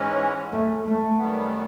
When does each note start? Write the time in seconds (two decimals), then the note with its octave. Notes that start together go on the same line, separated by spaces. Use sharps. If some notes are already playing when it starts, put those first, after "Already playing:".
Already playing: G#2 E3 G#3 C#4
0.52 A3
0.85 A3
1.18 F#2 D#3 G3 B3